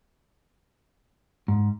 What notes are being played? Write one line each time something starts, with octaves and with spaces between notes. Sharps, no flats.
G#2